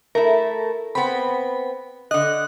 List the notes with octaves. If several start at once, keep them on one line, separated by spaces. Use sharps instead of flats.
A3 E4 A#4
B3 C4 B5
D3 D#5 F#6